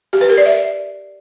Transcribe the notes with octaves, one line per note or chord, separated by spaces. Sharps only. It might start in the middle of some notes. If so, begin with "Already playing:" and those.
G4
B4
A#4
D5
E5